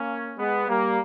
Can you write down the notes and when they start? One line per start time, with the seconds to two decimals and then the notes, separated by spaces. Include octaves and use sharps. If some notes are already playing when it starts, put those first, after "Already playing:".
Already playing: A#3 C#4
0.38 G#3 B3
0.68 G3 A#3